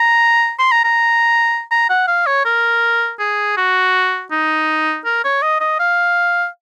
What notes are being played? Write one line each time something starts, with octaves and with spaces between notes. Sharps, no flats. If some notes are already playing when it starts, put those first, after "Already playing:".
Already playing: A#5
C6
A#5
A#5
A#5
F#5
F5
C#5
A#4
G#4
F#4
D#4
A#4
C#5
D#5
D#5
F5